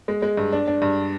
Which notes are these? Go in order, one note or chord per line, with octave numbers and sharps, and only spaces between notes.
G#3
G#3
G2
D4
D4
G2